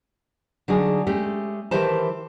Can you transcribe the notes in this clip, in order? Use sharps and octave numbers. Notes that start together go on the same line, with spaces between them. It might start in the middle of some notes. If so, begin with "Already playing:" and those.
D3 F#3 D#4 G#4
G#3 A3 C#4 G4
D#3 E3 E4 G4 C5 A5